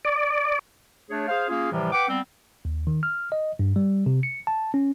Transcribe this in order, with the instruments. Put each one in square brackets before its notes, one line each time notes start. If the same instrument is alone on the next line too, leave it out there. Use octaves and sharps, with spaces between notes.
[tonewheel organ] D5
[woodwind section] A3 D4 G#4 C#5
G#4 C5 F5
A#3 C#4 F4 G#4
A2 C3 E3 F3 G3
B4 F#5 G5 D6
G3 B3 C4
[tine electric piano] D#2
D#3
F6
D#5
G2
G3
C3
C#7
A5
C#4